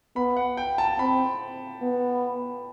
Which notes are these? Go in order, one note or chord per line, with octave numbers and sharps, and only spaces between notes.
B3 B5
F#5
G5
A5
C4 B5
B3